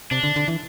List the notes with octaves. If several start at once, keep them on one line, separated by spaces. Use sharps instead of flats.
C3 D4
D3
D3
E3